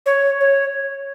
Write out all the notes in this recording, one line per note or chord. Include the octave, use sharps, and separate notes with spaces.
C#5
C#5